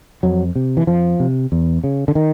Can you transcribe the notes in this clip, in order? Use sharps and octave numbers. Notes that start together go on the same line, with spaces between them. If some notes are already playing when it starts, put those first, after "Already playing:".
F2 F#3
C3
E3
F2 F3
C3
E2
C#3
D3
D#3